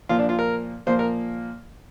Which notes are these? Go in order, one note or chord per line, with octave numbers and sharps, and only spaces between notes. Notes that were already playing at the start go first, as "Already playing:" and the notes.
A#2 F3 A#3 F4
D4
F4
A#4
A#2 F3 A#3 C5
A#4